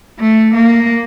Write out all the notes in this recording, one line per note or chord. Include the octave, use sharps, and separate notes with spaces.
A3
A#3